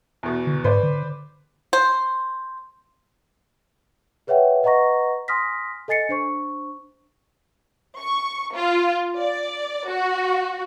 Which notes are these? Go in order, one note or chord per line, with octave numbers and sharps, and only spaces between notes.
E2 B2
D3
G#2 B4 C5 D5
D3
C5
G#4 B4 C#5 E5 F#5 G5
B4 D#5 F#5 A#5 C#6 A#6
G#5 C6 D#6 F6 A#6 B6
A4 D#5 G#5 A6 C7 C#7
D4 C5 C#6
C#6
F4
D5
F#4